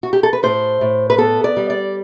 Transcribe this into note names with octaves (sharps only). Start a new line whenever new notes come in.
F#4
G4
A4
B4
A2 C5
A2
B4
B3 A4
D5
G3
D5